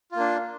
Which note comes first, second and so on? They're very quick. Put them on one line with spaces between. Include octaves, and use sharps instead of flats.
F4 A#3 D4